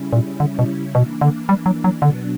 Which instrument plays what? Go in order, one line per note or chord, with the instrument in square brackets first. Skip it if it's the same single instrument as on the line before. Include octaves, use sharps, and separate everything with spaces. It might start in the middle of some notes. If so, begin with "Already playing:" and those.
Already playing: [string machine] C#3 G3 C#4 E4
[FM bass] A#2
D3
B2
[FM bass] B2 [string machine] E3 A#3 D4
[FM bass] D3
G3
F#3
F#3
[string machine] B2 F#3 B3 D4 [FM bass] D3